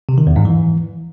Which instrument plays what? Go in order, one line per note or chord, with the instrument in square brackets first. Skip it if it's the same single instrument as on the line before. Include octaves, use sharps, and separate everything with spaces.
[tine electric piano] C3
D#3
E2
G#2
E3